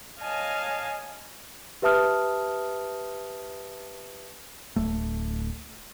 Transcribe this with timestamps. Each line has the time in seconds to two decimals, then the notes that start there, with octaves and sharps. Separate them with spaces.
0.20 C#5 D#5 F5 G#5 A5
1.82 G4 B4 E5 A5 D#6 F6
4.76 D1 A3